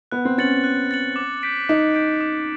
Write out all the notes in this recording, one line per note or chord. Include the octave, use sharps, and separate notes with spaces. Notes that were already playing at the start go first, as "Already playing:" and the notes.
B3 F#6
C4
C#4 A6 C#7 F#7
F#6
A6 C#7 F#7
D6
G6 B6 D7
D#4 D6
G6 B6 D7
D6